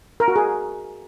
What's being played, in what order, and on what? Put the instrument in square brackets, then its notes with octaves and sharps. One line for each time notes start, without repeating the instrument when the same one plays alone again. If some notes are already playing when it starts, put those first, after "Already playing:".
[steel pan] A#4
F#4
G#4